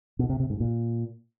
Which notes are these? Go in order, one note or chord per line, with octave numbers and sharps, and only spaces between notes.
B2
C3
C3
G#2
A#2